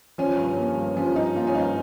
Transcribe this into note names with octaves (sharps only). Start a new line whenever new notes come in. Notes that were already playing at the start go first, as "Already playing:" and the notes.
F3 C#4
G2
A#3
G2
F3 C#4
G2 D#4
A#3 F4
C#4
G2 D#4